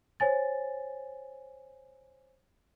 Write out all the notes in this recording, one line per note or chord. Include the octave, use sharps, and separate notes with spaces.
C5 C#5 G#5 A6